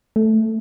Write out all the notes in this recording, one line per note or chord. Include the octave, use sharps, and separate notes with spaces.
A3